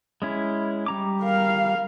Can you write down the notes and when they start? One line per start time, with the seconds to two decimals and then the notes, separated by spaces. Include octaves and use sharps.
0.22 G#3 C#4 E4
0.86 G3 A#5 D6
1.21 A#4 F5